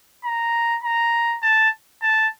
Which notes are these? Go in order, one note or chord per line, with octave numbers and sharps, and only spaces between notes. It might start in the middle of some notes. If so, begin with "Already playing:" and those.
A#5
A#5
A5
A5